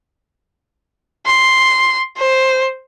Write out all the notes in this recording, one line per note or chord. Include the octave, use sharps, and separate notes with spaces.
C6
C5